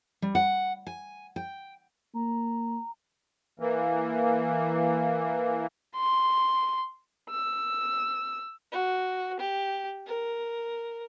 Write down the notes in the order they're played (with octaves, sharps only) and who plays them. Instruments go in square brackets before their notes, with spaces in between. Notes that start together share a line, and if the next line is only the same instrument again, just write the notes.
[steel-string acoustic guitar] G3
F#5
G#5
G5
[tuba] A#3 [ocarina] A#5
[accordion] E3 A#3
[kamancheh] C6
[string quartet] E6
[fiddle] F#4
G4
A#4